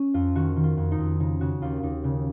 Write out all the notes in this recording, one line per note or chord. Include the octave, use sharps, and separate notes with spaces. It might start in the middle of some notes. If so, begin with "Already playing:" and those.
Already playing: C#4
F2 F4
D#3 F#4
D#3
F4
F2
D#4
F2
C#3 D#4
C#3 F#4
D#2 F4
D#2 D#4
C#3